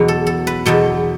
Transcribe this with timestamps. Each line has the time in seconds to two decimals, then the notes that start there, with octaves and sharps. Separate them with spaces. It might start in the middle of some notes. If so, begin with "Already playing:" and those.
Already playing: E2 B2 F#3
0.08 A4
0.27 A4
0.47 B4
0.66 E2 B2 F#3 A4